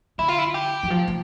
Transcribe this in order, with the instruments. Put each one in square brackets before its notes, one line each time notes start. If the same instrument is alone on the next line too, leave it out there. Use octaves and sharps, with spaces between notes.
[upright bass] D3 [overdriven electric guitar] E4
[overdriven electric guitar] F4
E4
G4
[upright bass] E3
F3
F3